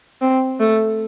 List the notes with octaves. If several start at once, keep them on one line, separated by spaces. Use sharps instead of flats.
C4
A3